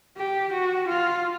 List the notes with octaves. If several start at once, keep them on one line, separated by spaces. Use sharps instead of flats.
G4
F#4
F4